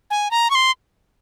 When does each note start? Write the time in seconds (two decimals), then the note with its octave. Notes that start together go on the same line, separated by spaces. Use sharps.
0.11 G#5
0.31 A#5
0.50 C#6
0.55 C6